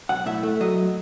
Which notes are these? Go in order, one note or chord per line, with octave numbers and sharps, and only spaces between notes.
B1 F#5
A2 E5
A3
F#3 D#5